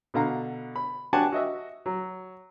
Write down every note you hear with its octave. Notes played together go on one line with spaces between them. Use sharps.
B2 D3 F5 A#5
B5
D4 F#4 G4 F#5 G#5 A5
F#4 D#5 E5
F#3